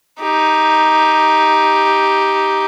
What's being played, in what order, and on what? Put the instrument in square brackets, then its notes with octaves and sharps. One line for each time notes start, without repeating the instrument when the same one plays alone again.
[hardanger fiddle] D#4 G4